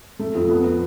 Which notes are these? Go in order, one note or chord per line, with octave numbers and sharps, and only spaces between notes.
A3
F2
B3
B3